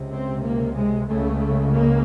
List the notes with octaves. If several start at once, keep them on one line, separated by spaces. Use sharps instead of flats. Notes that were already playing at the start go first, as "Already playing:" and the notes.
Already playing: C#2 C3
C4
A#3
G#3
C#2 C#3 A3
A#3